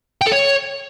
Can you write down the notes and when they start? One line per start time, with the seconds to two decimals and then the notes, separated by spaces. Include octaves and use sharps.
0.22 G5
0.27 A4
0.32 C#5